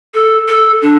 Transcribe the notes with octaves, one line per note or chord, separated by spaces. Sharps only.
A4
A4
D4